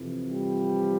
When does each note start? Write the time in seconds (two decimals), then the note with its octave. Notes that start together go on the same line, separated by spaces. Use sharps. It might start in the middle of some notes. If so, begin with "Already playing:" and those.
Already playing: F2 C3 E3
0.28 F3 G3